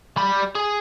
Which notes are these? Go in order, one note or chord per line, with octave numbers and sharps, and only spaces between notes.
G3 B5
G#4